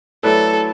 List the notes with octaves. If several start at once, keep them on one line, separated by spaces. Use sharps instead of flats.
F#3 A3 E4 A4 B4 D5